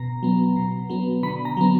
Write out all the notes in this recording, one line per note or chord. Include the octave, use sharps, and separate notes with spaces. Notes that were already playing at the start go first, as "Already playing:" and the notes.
Already playing: B2 A#5
F#3 B3
B2
F#3 B3
D3 B5
A#5
F#3 B3